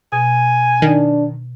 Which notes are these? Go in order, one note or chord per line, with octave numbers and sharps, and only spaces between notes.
B2 G#5
D#3 D4